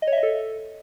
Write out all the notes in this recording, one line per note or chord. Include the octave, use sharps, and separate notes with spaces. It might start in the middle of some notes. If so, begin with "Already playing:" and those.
D#5
C#5
E5
D#5
A4